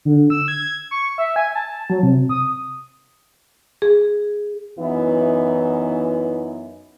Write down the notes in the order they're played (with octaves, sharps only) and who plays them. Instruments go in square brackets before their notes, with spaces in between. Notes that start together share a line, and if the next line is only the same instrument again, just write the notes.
[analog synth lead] D3
E6
G#6
C#6
E5
G#5
A5
F#3
C3
D#6
[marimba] G#4
[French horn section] F#2 E3 B3 D#4 E4